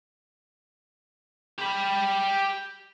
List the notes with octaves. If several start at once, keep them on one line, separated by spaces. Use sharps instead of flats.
G4 B5